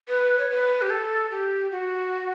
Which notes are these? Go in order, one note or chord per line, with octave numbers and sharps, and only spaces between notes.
B4
C#5
B4
G4
A4
G4
F#4